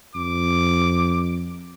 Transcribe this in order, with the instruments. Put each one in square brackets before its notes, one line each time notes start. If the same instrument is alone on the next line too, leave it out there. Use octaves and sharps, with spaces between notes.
[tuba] F2 [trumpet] D6